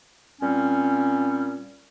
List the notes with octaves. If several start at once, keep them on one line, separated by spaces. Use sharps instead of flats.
A#2 G3 C4 C#4